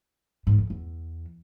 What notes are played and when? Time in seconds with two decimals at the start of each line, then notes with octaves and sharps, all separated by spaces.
0.47 G#2
0.58 F2
0.70 E2